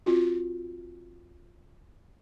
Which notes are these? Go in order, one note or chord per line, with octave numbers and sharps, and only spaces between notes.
C4 F4 F#4